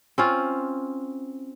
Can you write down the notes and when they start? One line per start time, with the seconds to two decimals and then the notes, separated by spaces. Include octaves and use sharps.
0.18 C4 C#4 F4